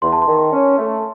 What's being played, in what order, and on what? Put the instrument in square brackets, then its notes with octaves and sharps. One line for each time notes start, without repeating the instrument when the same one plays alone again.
[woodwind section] E2 [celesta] C6
[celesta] A5
C6
[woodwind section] D#3
C#4
A3